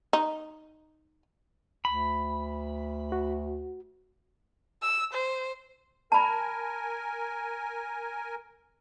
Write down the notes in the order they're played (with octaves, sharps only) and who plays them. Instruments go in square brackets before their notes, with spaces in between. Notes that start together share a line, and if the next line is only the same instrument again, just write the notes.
[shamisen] D#4
[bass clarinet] D2 [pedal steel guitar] B5
[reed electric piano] F#4
[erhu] E6
C5
[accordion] A#4 G#5 [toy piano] A5 B5